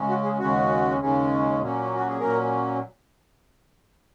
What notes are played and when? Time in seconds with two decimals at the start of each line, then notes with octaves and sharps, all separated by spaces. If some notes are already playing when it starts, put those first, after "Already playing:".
Already playing: C#3 G#3 C#4
0.09 F#4
0.24 G#4
0.39 D#2 C#3 G#3 C#4 F#4
1.00 D#2 C#3 G#3 C#4
1.60 A#2 F#3 A#3 C#4
1.96 F#4
2.08 G#4
2.20 A#2 F#3 A#3 C#4 A#4